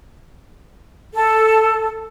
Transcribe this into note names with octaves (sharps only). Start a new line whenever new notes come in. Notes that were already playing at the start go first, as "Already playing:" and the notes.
A4